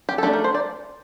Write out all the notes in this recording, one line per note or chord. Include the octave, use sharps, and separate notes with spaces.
G4
A4
A3 D4 G4
A#4
C5
D5